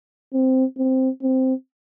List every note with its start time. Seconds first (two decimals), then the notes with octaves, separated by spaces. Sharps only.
0.33 C4
0.78 C4
1.23 C4